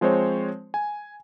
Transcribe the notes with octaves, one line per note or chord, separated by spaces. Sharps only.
F3 G#3 C4 C5 C#5
G#5